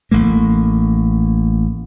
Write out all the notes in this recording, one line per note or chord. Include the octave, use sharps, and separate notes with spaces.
A1 A3 A#3